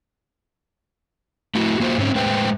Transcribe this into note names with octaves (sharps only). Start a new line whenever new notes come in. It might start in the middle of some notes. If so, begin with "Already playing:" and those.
A3 E4 F#4
A#3 F4 F#4 C5
G#2 C4 C#4
A2 G#3 B4 C5 G5